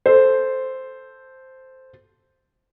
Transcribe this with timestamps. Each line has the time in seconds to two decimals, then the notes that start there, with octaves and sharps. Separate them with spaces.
0.06 A4 C5